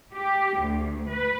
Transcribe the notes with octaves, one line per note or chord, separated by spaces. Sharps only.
G4
D2
B4